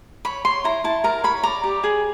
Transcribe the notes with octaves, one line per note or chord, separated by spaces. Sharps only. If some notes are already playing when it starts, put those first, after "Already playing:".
C#5 B5
C#5 C6
E4 A#5
E4 A5
A#4 A#5
C#5 B5
D5 A#5
G4
G#4